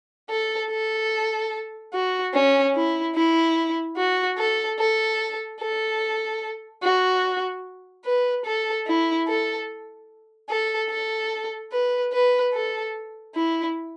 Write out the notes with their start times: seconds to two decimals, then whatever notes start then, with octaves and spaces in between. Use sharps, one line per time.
0.30 A4
0.70 A4
1.93 F#4
2.34 C#4
2.75 E4
3.15 E4
3.97 F#4
4.38 A4
4.79 A4
5.60 A4
6.83 F#4
8.05 B4
8.45 A4
8.87 E4
9.28 A4
10.49 A4
10.90 A4
11.72 B4
12.13 B4
12.54 A4
13.35 E4